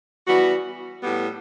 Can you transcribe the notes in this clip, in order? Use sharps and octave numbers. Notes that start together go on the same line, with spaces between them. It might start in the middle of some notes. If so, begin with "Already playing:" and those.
E3 G3 B3 F#4
A2 G3 B3